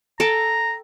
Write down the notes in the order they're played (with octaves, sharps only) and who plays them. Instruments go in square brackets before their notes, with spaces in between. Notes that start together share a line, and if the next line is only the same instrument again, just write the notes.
[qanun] A4 G5 A5 [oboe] A#5